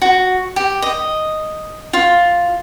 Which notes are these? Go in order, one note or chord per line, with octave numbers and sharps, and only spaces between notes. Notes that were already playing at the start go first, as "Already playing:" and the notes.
F#4
G4
D#5
F4